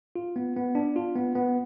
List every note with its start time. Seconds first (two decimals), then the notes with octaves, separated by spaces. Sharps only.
0.16 F4
0.36 B3
0.56 B3
0.75 D4
0.96 F4
1.15 B3
1.35 B3